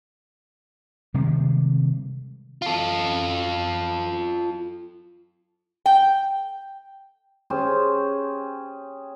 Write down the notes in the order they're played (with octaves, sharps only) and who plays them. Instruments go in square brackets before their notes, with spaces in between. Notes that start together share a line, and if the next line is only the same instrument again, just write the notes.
[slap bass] C3 D#3 G3 G#3
[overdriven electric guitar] F4 A4
[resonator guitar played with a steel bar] G5
[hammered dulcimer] C#4 G4 G#4 C5